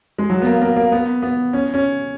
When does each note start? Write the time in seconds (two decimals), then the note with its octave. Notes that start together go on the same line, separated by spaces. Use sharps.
0.18 G#3
0.30 F#3
0.42 B3
0.46 A#3
0.61 A#3
0.76 A#3
0.92 B3
1.22 B3
1.53 C#4
1.74 C#4